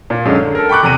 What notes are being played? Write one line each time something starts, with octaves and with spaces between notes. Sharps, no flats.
A#2
F#2 D3 G#3
D3
A4 A#4
G5 B5 C#6 D6 F#6
E2 C3 A#5 D#7